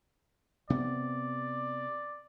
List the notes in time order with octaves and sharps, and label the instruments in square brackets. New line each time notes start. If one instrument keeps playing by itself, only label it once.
[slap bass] C3 B3 [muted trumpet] D5